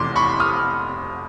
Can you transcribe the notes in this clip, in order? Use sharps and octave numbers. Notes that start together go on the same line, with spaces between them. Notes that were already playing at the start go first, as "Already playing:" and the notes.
Already playing: F1 F2 C3 E3 C6 D6
B5 C#6
D#6 F6